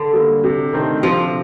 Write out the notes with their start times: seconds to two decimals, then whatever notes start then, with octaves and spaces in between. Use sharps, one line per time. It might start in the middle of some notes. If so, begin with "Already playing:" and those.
Already playing: D3
0.13 G3 A#3
0.44 C3
0.73 D#3 A3 C4
1.03 C3 F3